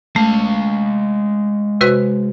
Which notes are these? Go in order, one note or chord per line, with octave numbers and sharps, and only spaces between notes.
G#3 A3 F5
C3 F#4 B4